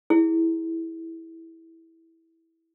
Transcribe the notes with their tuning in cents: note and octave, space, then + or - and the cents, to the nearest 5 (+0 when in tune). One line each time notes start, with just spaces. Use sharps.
E4 -10 G#4 -5